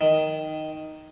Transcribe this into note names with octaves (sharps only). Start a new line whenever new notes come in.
D#3